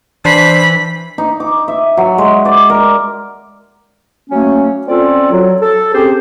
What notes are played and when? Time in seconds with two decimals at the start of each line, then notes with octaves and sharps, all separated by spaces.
0.25 E3 D4 C5 B5 C7
1.18 D#4
1.40 D6
1.68 E5
1.97 F#3
2.18 G#3
2.45 D5
2.70 A#4
4.30 F#3 A3 A#3 C#4
4.87 C4 C#4 F4 A4 D5
5.32 F#3
5.62 A4
5.94 C4 C#4 G4 G#4 C5